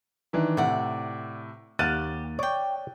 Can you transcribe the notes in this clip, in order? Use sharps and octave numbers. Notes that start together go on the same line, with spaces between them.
D#3 E3 D4
A2 C3 D5 F#5
D#2 G4 F5 F#5 F#6 A6 D#7
C#5 D5 G5 D6